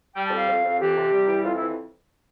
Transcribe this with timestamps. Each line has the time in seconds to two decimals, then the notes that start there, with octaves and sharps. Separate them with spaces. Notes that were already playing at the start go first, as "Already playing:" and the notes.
0.14 G3 G5
0.25 A5
0.30 F2
0.36 F5
0.47 F2
0.63 F2
0.79 E3 G4
0.95 C3
1.11 G3
1.27 E3
1.43 F2 F4
1.55 E4
1.60 E3